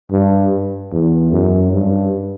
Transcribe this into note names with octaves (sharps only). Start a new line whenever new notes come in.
G2
E2
F#2
G2